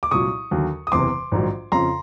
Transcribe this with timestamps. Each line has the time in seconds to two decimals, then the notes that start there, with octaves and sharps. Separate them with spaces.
0.03 D6
0.11 C2 A#2 F#3 C#6 D#6
0.51 D#2 D3 F#3
0.87 D#6
0.92 F#1 E2 C3 E3 C6 D6
1.32 A#1 G#2 D#3 F#3
1.72 F2 C#3 F3 A#5 C6